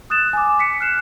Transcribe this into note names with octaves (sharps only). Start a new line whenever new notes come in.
D#6 F#6 A6 E7
G#5 D6
B6 C#7
F6 F#6 C7 E7